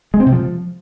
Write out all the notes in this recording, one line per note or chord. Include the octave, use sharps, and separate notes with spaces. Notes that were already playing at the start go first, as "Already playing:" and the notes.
G#3
C4
C3
F3